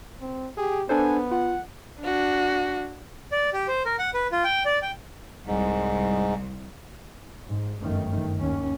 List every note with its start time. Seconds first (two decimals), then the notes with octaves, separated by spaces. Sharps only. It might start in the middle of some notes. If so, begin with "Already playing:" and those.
0.20 C4
0.57 G4 G#4
0.89 B3 D4 A4 C5 G#5
1.31 F4 F#5
2.01 D4 F#4
3.32 D5
3.53 G4
3.68 C5
3.85 A#4
3.99 F#5
4.14 B4
4.32 F4
4.44 G5
4.65 D5
4.82 G5
5.47 C2 G#2
7.46 G#2
7.81 G1 F#2 D#3 A3
8.40 D#2 C#4